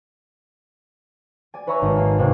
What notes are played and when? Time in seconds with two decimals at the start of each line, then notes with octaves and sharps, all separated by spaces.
1.54 D5 G#5
1.67 B4 C#5 E5 A#5 C#6
1.82 G#1
1.97 A#3
2.18 D#2 C3 A#3